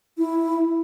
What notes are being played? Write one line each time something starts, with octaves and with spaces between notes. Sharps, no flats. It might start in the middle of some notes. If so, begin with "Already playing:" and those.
E4